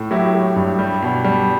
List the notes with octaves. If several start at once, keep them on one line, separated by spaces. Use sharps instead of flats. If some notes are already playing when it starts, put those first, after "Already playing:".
Already playing: A2
F#3 E4 G4
A3
G2
G3
B2
G3